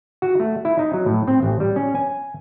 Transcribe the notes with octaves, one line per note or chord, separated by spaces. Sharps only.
F#4
A3
E4
D#4
F#3
A2
C4
A1
G3
C#4
G#5